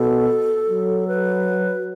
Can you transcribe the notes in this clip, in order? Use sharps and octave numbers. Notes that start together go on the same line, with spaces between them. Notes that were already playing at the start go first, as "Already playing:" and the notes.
Already playing: B2 A4
F#3
B4